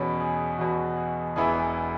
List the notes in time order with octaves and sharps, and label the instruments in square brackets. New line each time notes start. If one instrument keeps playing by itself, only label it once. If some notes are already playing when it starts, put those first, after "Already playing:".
Already playing: [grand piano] E2 B2 B3 C#4 C#5
G#4
E2 B2 B3 F#4
G#4
E1 E2 E3 B3 E4 G#4